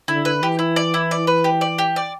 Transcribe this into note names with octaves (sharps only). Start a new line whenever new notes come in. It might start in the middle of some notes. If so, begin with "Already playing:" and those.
D3 E4
B4
E3 G4
E4
D5
E4
D5
B4
G4
D5
G4
D5